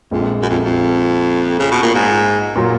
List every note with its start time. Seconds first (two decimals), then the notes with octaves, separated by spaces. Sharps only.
0.11 A#1 F2 A#2 G#3
0.42 F#2
0.50 F2
0.65 F2
1.59 C#3
1.71 B2
1.82 A#2
1.94 G#2
2.56 A#2 F#3 A#3 F4